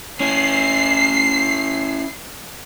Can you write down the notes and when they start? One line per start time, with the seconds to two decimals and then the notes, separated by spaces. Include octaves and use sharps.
0.20 C#4 E4 C7